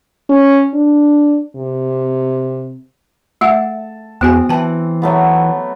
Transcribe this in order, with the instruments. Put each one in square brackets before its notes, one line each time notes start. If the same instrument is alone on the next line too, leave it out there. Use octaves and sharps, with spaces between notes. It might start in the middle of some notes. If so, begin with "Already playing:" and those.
[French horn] C#4
D4
C3
[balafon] A3 E5 F#5 [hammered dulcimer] A4
[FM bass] E2 [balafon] B3 F#4 G#5 [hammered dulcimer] C4
[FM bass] E3 [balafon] G5 A5
[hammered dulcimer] F#3 A3 B3